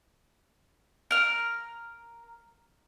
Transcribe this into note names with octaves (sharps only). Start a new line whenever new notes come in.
A#4 F6